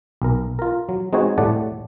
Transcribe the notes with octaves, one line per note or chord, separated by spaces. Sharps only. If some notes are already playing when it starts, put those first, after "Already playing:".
B1 A#4
F4 A#4
F#3
G#3 C4 D#4 F#4 C5 C#5
A2 G3 A3 D5 F#5 A5